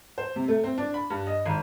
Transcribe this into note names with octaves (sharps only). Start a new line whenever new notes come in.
C5
C3
A3
C4
D4
B5
G2
D#5
G#1